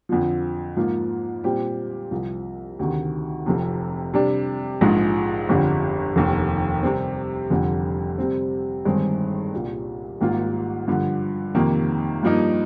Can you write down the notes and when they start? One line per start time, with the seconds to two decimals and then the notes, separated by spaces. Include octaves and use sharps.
0.09 F2 D3 F3
0.77 G#2 F3 A#3 F4
1.44 A#2 G3 C4 G4
2.11 C2 C3 F3
2.79 D2 C3 D#3
3.46 F1 F2 C3
4.14 C3 G3 D4
4.81 A#1 G#2 F3 G#3
5.49 G1 F2 D3 G3
6.16 F1 D#2 D#3
6.83 C3 G3 C4
7.50 F1 F2 D3 G3
8.18 C3 G3 C4
8.85 G1 G2 D#3 G#3 C4
9.53 C2 A#2 G3
10.20 G#1 G#2 G3 A#3 F4
10.88 G2 D3 F3
11.55 F2 C3 D#3 A#3
12.23 G2 F3 A#3 D#4